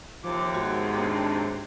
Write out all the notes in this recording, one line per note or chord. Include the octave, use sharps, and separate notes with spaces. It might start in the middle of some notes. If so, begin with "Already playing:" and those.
D#2 C3 F3 D6
G#2 B3 F#4 C5
C4 D4